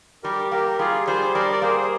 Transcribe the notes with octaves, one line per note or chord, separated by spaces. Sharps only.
G3 G4 A#4
A#3 G4 A#4
G3 F4 G#4
G3 G#4 C5
G3 A#4 D5
D5
A#3 G#4 C5